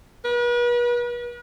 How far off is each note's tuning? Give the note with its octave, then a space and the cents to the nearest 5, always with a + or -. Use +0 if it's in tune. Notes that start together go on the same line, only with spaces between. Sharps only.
B4 -40